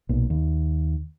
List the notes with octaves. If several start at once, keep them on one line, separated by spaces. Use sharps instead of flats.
B1 A#2
D#2